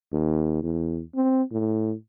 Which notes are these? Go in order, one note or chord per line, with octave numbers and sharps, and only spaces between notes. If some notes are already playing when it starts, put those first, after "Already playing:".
D#2
E2
C4
A2